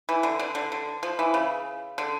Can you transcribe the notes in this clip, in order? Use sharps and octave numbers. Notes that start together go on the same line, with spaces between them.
E3
D3
D3
D3
D3
F3
E3
C#3
D3